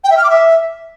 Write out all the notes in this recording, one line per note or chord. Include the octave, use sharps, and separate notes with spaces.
G5
E5
F6
D6
E5